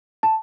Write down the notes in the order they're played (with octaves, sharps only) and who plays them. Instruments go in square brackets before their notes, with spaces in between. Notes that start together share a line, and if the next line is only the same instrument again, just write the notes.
[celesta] A5